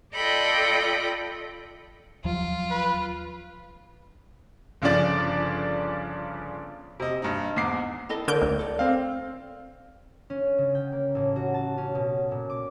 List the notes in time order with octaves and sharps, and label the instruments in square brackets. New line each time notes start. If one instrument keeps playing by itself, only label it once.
[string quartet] F4 A4 D5 D#5 G5 B5
[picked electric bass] D#2 F3 F#3 [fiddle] F4
[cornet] B4
[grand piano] G1 C#3 F3 D4 D5 D6
[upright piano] C3 D#5
G2 D#4
E2 G#2 D6 C7
[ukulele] E4 A4 D#5
[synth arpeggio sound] D3 G6 D7 [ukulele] A#4 C#5
[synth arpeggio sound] D2
[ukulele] A4 D5
[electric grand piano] C4 F5
[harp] C#4
C#3
G5
A#3
A1
F#4
A5
C#4
B2
A#2
D6